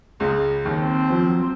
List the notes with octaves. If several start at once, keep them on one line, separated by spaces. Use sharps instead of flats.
C#2 C#3 G#3
D#2 D#3
C4
F2 F3
F#3
F3